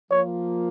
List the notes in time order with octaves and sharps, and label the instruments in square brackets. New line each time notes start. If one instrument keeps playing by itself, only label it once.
[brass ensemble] F3 A#3 F4 [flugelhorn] C#5